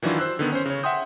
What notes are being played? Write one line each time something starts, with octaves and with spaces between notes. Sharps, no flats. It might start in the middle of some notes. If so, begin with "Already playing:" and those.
D#3 E3 F#3 D4 E4 F4
C5 E6 F#6
D3 D#3 B3
C#4 C5
C#3 C#5
E5 F#5 G5 C6 D#6 G6